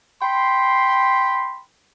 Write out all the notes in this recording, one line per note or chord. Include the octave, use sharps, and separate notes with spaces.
G5 B5 C6